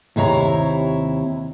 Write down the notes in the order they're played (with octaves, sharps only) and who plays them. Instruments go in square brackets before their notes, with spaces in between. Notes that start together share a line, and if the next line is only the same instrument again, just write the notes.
[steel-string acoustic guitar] D#2 C3 E4 C#5 A#5